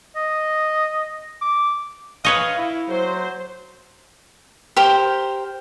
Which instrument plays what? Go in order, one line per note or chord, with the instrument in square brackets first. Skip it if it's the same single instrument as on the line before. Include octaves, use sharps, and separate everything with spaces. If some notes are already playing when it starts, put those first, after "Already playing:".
[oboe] D#5
D6
[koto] B4 C#5 D#5 [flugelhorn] F5
[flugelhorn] E4
[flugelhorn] F#3 [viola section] C5
[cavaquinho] G4 A#4 C5